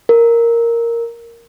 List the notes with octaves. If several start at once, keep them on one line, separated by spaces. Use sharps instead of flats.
A#4